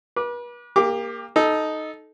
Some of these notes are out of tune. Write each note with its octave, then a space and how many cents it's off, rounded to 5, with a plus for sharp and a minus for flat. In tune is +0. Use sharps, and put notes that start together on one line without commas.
B4 -40 D6 +0
A#3 +0 G4 +30 D6 +0
D#4 +0 A4 -15